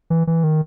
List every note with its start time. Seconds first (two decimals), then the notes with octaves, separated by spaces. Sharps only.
0.10 E3
0.27 E3
0.44 D#3